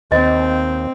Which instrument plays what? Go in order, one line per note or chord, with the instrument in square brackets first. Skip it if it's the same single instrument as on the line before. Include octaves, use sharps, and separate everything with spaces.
[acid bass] D#2 [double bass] C4 [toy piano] D#5